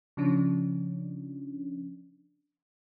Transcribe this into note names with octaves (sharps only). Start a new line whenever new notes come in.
C#3 F3 C#4 D4